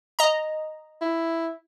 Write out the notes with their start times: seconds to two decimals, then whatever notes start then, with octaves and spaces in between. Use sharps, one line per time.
0.19 D#5 A#5
1.01 E4